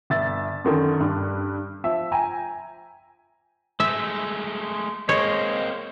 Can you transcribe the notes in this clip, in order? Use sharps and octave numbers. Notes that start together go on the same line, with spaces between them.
G1 E5 A6
F#2 D3 D#3
G2
F3 E5
G5 G#5 A#5
G#3 A3 E5
G#3 A#3 C4 C#5